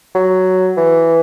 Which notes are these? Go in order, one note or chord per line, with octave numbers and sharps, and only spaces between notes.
F#3
E3